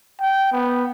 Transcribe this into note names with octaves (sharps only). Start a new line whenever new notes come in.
G5
B3